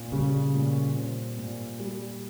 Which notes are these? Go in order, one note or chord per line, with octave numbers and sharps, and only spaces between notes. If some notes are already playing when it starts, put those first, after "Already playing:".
Already playing: A#2 C4
C#3 G3
A#2
C4
A#2
G3